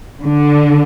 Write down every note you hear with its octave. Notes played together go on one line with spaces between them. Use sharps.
D3